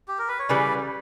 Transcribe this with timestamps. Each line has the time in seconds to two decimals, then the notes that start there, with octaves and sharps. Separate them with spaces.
0.08 G4
0.18 A#4
0.28 B4
0.39 C#5
0.49 C#3 E3 G3 B4 D5